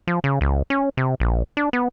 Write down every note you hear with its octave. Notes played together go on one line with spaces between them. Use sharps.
F3
C#3
C#2
C#4
C3
A#1
D4
B3